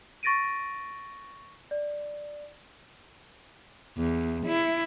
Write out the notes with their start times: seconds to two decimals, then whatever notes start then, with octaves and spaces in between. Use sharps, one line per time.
0.23 C#6 A6 A#6 D7 D#7
1.71 D5
3.97 E2
4.46 E4